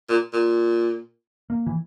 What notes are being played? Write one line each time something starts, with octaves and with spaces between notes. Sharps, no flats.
A#2
A#2
A#3
E3